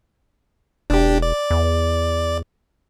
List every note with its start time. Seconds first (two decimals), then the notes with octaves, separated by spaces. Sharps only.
0.90 E1 D4 G4
1.22 D5
1.51 E2